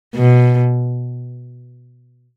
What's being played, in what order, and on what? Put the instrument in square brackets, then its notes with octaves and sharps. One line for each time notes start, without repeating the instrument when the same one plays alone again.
[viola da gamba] B2